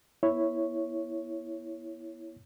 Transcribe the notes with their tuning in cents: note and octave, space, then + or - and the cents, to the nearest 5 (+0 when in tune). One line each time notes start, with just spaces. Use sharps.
B3 -25 E4 +0 C#5 +0